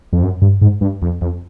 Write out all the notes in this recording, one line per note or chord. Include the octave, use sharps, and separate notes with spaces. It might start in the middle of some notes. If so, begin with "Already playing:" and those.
F2
F#2
G2
G#2
G2
F2
F2